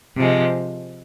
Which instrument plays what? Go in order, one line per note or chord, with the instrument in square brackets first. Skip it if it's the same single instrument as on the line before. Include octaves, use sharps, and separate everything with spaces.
[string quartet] C3 F3 G#3